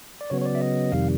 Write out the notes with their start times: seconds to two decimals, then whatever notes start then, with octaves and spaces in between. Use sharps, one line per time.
0.21 D5
0.30 C#3 F#3 B3 C#5
0.41 C#5
0.46 D5
0.55 E5
0.61 D#5
0.92 F2 C3 D#3 G3 F5